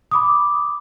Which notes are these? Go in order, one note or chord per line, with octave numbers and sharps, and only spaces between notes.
B5 D6 D#6